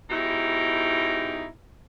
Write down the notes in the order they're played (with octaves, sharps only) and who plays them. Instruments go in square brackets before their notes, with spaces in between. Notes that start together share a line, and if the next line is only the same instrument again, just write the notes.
[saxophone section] G#2 B2 D#4 E4 G4